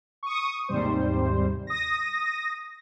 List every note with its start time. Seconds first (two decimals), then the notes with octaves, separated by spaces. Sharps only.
0.23 C#6 D#6
0.69 D#2 G#2 C3 G3 C5
1.67 D#6 A#6